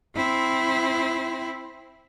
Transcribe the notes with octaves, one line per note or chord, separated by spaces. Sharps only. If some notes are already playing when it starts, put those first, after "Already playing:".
C4 E4